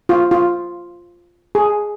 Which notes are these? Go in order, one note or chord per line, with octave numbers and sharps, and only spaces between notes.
F4
F4
G#4